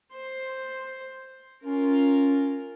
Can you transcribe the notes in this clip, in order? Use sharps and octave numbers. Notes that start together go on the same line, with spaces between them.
C5
C#4 F4 A#4